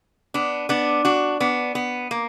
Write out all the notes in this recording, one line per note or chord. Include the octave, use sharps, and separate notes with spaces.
B3 D4
B3 D4
D4 F#4
B3 D4
B3
A#3